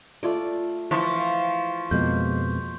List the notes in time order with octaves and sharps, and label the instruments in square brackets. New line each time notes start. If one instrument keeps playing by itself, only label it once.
[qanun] A3 F4 D5
[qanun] E3 [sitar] F3 [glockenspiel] C6 C#6 B6
[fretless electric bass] F2 B2 G#3 [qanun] A#3 [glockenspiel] G6